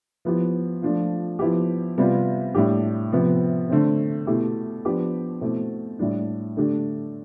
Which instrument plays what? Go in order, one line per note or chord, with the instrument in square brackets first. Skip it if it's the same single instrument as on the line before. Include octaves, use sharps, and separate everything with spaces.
[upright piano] F3 B3 E4 G4
F3 A3 D4 F4
F3 B3 E4 G4
C3 G3 B3 F4
A2 G3 D4 G4
C3 F3 B3
D3 A3 C4
B2 A3 E4 G4
F3 B3 D4 G4
B2 A3 C4 E4
A2 G3 D4
D3 A3 D4 G4